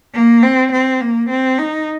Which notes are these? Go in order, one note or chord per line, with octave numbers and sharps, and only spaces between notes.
A#3
C4
C4
A#3
C4
D#4